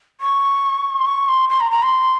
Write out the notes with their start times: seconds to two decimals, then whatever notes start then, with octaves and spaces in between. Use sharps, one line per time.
0.20 C#6
0.99 C6
1.06 C#6
1.28 C6
1.49 C6
1.60 A#5
1.71 A#5
1.82 C6